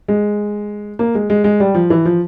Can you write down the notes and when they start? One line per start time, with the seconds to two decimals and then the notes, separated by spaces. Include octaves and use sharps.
0.08 G#3
0.99 A#3
1.15 G#3
1.30 G#3
1.44 G#3
1.60 G3
1.75 F3
1.90 E3
2.05 F3